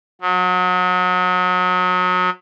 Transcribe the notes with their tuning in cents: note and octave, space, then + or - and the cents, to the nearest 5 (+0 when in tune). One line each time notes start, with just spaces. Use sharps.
F#3 -30